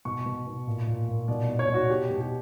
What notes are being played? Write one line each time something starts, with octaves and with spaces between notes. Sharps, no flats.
B2 C#6
B2
B2
A#2
A#2
A#2
B2 D5
B2
C#5
B2 F#4
B2 G4
B2
G4